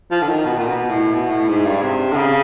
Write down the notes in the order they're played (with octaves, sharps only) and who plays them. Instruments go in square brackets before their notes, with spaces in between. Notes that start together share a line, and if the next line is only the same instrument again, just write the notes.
[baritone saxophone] F3
D3
D#3
B2
A#2
B2
A2
B2
A2
G#2
G2
C3
D3
C#3